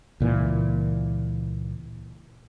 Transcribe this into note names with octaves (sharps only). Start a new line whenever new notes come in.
C#2 A#2 E3